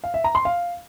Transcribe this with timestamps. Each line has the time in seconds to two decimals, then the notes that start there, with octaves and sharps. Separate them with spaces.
0.04 F5
0.14 E5
0.24 A#5
0.35 C6
0.45 F5